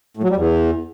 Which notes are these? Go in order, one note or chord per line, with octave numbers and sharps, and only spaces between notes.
A2
F#3
G3
E2